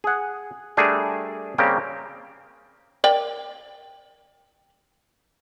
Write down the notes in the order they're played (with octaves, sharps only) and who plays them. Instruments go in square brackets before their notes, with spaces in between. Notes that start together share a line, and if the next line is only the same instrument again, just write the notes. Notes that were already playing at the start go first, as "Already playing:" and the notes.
[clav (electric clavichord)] G#4 F#5
G3 A3 D4 G#4 A#4
C#3 G3 A#3 C4 G4
[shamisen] A#4 D5 G5